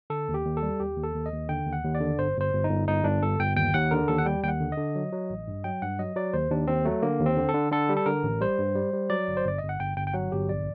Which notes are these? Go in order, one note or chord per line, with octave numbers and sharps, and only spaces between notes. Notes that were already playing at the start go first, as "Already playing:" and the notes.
D3 A4
D#2
G4
D#2
A4
G3
D#2 G4
D#2
A4
D#2
D#5
D#2
D3 G5
D#2
F#5
D#2
D5
D3
G1 C5
G1 C5
G1
D#4
G1
G1 D#4
G1 D4
G1 A4
G1 G5
D#2 G5
D#2 F#5
D3 A#4
D#2 A4
F#5
G3 G5
D#2 G5
F#5
D3
D#5
D3
F#3
F#3
A1
G2
F#3 G5
G2 F#5
F#3 D#5
F#3 D5
D#2 C5
D#2 D4
D#2 C4
F#3 A3
D3 A#3
D#2
C4
D3
A4
D3
D3 A4
G3
A4
D3 A#4
A1
G3 C5
G2
G3
G3
F#3 D5
G1
C5
G1 D5
G1 D#5
F#5
G1 G5
G1 G5
G5
F#3 F#5
G1 G4
A#1 D5